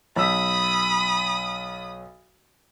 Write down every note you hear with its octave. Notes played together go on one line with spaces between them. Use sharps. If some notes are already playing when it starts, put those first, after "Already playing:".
B1 B5 D#6 E6 B6